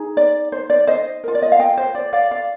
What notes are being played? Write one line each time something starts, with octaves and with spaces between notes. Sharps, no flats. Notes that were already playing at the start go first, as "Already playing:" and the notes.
Already playing: D#4 G#4
D5
C5
D5
C5 D#5
F4 A#4
D5
D#5
F5
D#5 G5
C5
D5
D5 F5
D5 F5